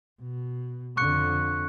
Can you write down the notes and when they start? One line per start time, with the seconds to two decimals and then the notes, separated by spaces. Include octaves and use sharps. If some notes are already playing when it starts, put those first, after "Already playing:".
0.21 B2
0.97 F2 D3 C#6 F#6 C#7